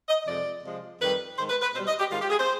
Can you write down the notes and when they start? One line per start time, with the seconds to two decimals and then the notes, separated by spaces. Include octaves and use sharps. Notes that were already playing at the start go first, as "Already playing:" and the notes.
0.09 D#5
0.27 F2 C3 F3 G#3 D5
0.64 C3 F3 G#3
1.01 F2 D#3 G3 B4
1.37 G#2 D#3 G#3 C5
1.50 B4
1.62 B4
1.75 B2 C5
1.79 G3
1.88 D#5
1.99 G4
2.11 G#2 D#3 G#3 F4
2.21 G4
2.30 G#4
2.40 C5